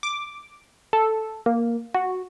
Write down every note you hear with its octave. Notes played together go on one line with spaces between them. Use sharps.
D6
A4
A#3
F#4